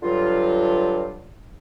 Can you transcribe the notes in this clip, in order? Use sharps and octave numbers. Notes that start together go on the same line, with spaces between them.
G2 D3 F#3 F4